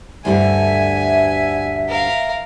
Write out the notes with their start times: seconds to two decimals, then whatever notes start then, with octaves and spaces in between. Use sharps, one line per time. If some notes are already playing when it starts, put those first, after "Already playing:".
0.25 D2 G2 D3 E5 G#5
1.89 A#4 F5